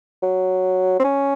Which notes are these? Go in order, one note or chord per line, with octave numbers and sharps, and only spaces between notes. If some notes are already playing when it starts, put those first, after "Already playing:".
F#3
C4
C#4